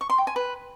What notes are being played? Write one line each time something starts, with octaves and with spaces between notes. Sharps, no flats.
C#6
C6
G5
G#5
B4